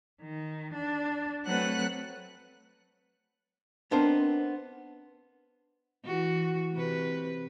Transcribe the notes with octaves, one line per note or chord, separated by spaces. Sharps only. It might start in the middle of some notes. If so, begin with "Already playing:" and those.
D#3
D4
F#3 A3 C4 B4 F#5 F#6
B3 C4 D4 D#4 A#4 C5
E3 F#4
C3 B4